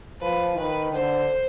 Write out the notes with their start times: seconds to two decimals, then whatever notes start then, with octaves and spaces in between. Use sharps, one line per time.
0.21 F3 B4
0.56 D#3 B4
0.92 D3 C5